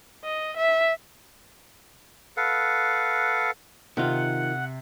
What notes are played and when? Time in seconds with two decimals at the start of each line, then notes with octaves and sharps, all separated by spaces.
0.24 D#5
0.57 E5
2.37 A4 B4 F5 F#5
3.97 C3 D#3 F4 F#5